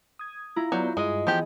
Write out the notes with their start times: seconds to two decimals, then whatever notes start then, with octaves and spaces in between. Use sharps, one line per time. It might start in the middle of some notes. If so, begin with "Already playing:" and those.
0.19 D#6 G#6
0.56 E4 F4 A#5
0.72 F#3 B3 D5 G6
0.97 G2 G#3 G#4 D#5
1.27 E3 F3 B3 G4 G#4